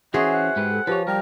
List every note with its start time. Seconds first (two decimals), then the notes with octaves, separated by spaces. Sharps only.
0.14 E3 C#4 F#4 G#4 C5 E5 F#5
0.33 F#5
0.56 G#2 G4 B4
0.70 A4
0.87 F3 G4 B4 C#5
1.07 G3 A#4 G5